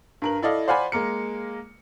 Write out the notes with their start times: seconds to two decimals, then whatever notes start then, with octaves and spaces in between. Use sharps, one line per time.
0.22 G2 A#4 F#7
0.42 E4 A4 D5 D#5 F5
0.68 C5 D5 F5 F#5 G#5 B5
0.92 G#3 A#3 A#4 C#7